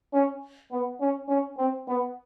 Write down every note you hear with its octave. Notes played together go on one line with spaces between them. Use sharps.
C#4
B3
C#4
C#4
C4
B3